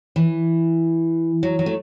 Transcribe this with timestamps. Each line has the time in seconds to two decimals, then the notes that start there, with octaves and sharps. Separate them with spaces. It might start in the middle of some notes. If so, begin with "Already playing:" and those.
0.16 E3
1.43 F#3
1.59 F#3
1.66 A3